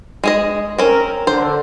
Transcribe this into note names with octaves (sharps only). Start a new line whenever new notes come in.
G#3 G#4 D#5
C4 C#4 A#4
D3 C5